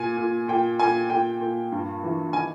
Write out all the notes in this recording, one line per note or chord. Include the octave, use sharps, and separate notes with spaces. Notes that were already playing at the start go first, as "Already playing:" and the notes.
Already playing: A#2 G#5
A#2
A#2 G5
A#2 G#5
A#2 G5
A#2
G2
E3
D#3 G#5